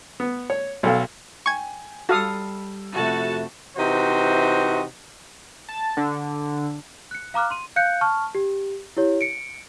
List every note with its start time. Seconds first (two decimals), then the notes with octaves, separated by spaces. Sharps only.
0.20 B3
0.50 C#5
0.83 B1 A4 F5
1.46 G5 G#5 C#6 G#6
2.09 G3 F#4 A4 F5 D#6 E6
2.95 F2 C3 A3 F#4 A5
3.77 C3 E3 D#4 F#4 C5
5.69 A5
5.97 D3
7.11 F#6 C#7
7.34 F5 A#5 D6 F6 F#6
7.51 C6 D#7
7.76 F5 F#6 G6 C#7
8.01 A5 C#6 F6
8.35 G4
8.97 E4 G4 C#5
9.21 C#7 D7